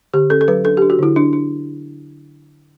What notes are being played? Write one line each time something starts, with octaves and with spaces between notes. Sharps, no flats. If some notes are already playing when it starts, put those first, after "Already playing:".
D3 G4
C#4 A4
A4
F#3 B4
D4 A4
D4 G4
F#4
D3 E4
D4
D4